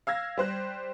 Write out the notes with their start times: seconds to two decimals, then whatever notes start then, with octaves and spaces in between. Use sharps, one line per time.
0.07 F5 E6 G#6 A#6
0.38 G3 C5 F#6